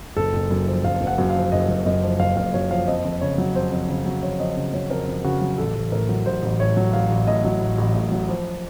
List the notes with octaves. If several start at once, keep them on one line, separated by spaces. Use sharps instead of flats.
F#1 A4
F#1
F#2
F3
F#1 F5
F#1
F#5
F#2
F5
F3
F#1 D#5
F#1
F#2 D#5
F3
F#1 F5
F#1 F5
F#2 C#5
F3 F5
F2 D#5
F2
C#3 C#5
F#3
F2 C5
F2
C#3
F#3
F2 C#5
F2 D#5
C#3
F#3 C#5
F2 A#4
F2
C#3 F#4
F#3
A1 A4
A1
A2 A#4
F#3
A1 C5
A1
A2 C#5
F#3
A1 F5
A1
A2 D#5
F#3
A1
A1
A2
F#3
F3